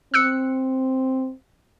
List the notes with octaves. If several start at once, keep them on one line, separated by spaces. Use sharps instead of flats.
C4 E6 F#6 C#7